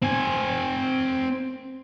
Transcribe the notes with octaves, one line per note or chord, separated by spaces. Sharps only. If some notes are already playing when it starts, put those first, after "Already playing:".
C4 G#5